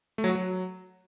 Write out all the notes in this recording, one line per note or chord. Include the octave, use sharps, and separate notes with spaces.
A3
F#3
F#4
F#3